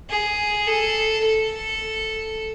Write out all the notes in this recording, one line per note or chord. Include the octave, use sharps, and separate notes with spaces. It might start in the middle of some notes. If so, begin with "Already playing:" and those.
G#4
A4
A4